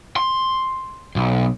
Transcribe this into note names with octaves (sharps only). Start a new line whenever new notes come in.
C6
B1